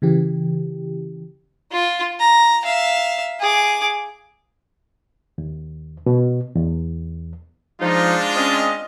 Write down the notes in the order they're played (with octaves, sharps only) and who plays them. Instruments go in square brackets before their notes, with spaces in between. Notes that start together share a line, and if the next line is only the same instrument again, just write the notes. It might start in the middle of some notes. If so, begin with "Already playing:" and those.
[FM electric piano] C#3 E3 G4
[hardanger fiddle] F4
A#5
E5 F5
G#4 D6
[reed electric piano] D#2
B2
E2
[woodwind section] F3 D#4 [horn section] G#3 D4 F4
[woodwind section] C4 C#4 D#5